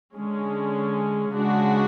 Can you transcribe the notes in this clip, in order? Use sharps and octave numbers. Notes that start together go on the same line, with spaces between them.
D3 G#3 C#4
C#3 G#3 D4 F#4